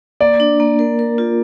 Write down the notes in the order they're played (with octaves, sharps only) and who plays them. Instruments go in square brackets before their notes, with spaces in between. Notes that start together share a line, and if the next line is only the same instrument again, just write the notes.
[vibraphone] A#3 [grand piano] D5
[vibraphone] D4
A#3
A#4
A#4
F4